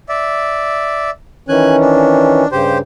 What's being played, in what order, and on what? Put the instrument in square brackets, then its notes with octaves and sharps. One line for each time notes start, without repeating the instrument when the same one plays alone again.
[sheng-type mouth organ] D5 E5
[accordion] D#3 E3 C#4 [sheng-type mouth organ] G#5 F#6
[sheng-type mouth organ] D4
[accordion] G2 C#3 [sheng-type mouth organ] G4 C5